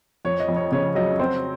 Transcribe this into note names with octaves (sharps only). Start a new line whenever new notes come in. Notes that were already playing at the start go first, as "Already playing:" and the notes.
F2 C#5
D#5
F2
C#5
C#3 C#5
F#3 D#5
C4 C5